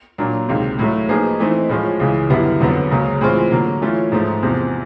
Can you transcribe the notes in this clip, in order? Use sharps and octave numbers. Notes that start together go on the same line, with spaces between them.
A#2 F#3 A#3 D4
C#2 C3 D#3
A2 F#3 A3
F3 A#3 D#4 G#4 B4
E3 A3 C4 D#4
A2 F3 G#3 C#4 F4
C#2 C#3 E3
F#2 D3 G3 B3 E4
F2 D3 F#3 B3
C#2 C#3 F#3 A#3
A2 E3 G#3 C4 F4
D3 F#3 A#3
E3 A3 C#4 F4
G#2 F3 A3
E2 C3 F3